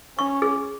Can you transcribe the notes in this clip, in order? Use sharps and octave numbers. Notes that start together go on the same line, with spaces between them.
C#4 C#6
G#4